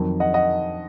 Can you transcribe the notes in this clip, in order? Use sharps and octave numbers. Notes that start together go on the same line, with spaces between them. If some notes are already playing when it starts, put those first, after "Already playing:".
Already playing: F2 D#3 F#3
D#5 F#5
D#5 F#5